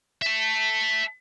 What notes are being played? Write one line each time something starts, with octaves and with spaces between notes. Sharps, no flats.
E5 A5